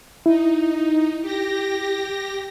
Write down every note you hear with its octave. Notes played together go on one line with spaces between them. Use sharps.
D#4 E4
G4 A#6